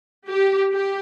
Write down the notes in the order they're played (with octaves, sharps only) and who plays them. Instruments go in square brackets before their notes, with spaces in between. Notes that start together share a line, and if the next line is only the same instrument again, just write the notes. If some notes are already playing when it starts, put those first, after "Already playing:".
[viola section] G4
G4